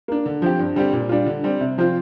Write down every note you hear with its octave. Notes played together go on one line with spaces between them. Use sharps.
A#3 D4
D3
F3 C4 G4
G2
D3 G3 C4 G4
A#2
G3 D4 F4
D3
G3 C4
C3
F3 C4 F4